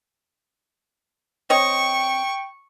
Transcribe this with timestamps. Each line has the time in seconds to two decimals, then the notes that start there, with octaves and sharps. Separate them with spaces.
1.50 C4 C#5 D#5 G5 C#6